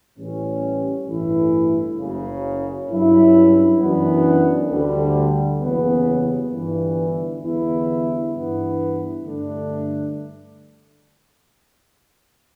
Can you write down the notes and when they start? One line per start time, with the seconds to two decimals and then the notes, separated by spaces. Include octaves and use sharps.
0.16 A1 A2 E3 G3 C#4
1.06 A1 G2 E3 A3 E4
1.97 F#1 F#2 C#3
2.88 G2 F#3 C#4 E4
3.79 F#2 E3 B3 D4
4.70 D2 D3 G3
5.61 F#1 E2 C#3 G3 B3
6.50 G1 G2 E3
7.42 E2 D3 G3 B3 E4
8.33 G2 E3 B3 E4
9.23 G2 D3 A3 D4